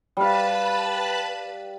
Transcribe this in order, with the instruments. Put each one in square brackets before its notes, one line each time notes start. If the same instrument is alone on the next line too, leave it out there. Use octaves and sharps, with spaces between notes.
[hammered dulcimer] G3 F5 [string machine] B4 A5 B5